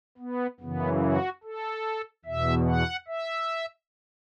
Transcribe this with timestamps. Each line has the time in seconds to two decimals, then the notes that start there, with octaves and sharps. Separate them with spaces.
0.18 B3
0.60 F#2 C#3 E3 B3
1.01 F#4
1.43 A4
2.25 E2 B2 E5
2.67 F#5
3.08 E5